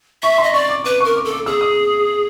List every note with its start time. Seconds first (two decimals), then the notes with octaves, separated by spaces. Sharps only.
0.23 E5 C#6
0.38 C6
0.43 D#5
0.53 D5 C#6
0.69 D6
0.84 B4 D6
1.00 A#4 C#6
1.15 D6
1.25 A4
1.31 D6
1.46 G#4 E6
1.61 D#6